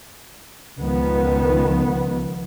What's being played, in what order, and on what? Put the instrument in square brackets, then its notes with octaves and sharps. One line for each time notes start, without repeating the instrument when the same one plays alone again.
[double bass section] C#2 D#3 F3 B3